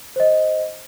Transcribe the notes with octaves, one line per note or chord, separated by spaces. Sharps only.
C5 D#5